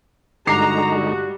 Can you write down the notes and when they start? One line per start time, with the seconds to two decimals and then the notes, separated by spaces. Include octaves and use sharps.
0.47 G2 D3 G#3 D#4 F#4 A#5 D6 C7
0.94 G3